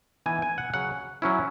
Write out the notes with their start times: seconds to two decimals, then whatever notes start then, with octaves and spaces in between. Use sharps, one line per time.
0.26 E3 B3 D#4 G#5
0.42 G#5
0.58 F#5
0.74 C#3 F#3 C#4 F#5
1.22 F#3 C#4 E4